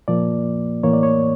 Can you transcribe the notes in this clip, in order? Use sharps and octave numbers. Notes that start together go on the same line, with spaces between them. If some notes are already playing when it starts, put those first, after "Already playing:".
A#2 F3 A#3 D5
A2 E3 A#3 C#5
D5
C#5